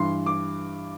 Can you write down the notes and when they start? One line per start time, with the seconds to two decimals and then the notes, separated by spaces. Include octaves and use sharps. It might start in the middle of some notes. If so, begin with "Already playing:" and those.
Already playing: G2 E3 C6
0.26 D6